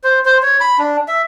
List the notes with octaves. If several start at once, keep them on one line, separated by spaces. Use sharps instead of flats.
C5
C5
C#5
B5
D4
E5